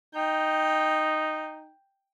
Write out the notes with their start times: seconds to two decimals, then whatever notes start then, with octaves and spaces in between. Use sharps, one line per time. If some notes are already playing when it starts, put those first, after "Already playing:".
0.15 D#4 G5